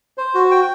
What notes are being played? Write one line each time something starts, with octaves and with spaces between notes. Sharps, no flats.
C5
F#4
G5